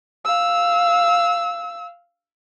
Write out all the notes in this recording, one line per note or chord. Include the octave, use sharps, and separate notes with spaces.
F5 E6